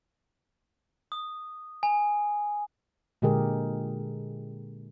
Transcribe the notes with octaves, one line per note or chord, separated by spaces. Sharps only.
D#6
G#5
A#2 D3 G#3 G4 G#4 A#4